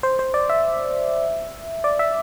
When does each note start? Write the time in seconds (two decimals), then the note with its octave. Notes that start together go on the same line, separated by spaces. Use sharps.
0.03 C5
0.19 C5
0.34 D5
0.50 E5
1.84 D5
1.99 E5